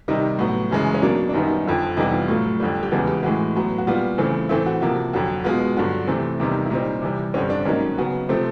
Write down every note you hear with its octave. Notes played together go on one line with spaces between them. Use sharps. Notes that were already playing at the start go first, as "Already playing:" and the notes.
C3 D#3 G3 D#4
A2 F#3 B3
F#2 C#3 E3 G#3
C#4
B2 F#3 A#3 D4
D4
F#2 D#3 G3 B3 D#4
F2 D3 F3
F2 C3 E3 G3 B3 D#4
F4
A2 F#3 A3 F4
F2 D3 G3
G4
E2 C#3 E3 G#3 B3 F#4
G4
A2 E3 G#3 F#4
A2 F#3 B3
F#4
A#2 G3 B3 F4
C#3 E3 A3 C4
A2 E3 A3 C4 E4
F#4
C3 F3 A#3 F#4
F2 D3 F#3
B2 G#3 B3 F4
G2 D3 F#3
C3 E3 A3 C4
E2 C3 D#3 G3
E4
A#2 G3 C4 D#4
C3 E3 G3
G2 D3 G3 C4 C#4
D4
G#2 D#3 F#3 A#3 C#4
C#3 F#3 B3
C3 F3 A3 C4